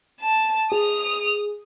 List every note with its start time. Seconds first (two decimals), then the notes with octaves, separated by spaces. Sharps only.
0.21 A5
0.72 G#4 D#6 F7